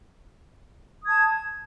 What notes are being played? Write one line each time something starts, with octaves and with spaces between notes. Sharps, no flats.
A5 D#6 G#6